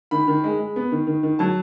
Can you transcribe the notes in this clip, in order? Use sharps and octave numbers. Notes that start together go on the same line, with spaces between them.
D#3 B5
D#3
G#3
G#3
B3
D#3
D#3
D#3
F#3 A5